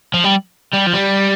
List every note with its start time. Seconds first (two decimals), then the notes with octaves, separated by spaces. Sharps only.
0.14 F3
0.24 G3
0.73 G3
0.86 F3
0.93 G3